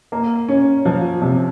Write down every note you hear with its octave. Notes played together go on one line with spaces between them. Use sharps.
A#3
C#4
F3
C3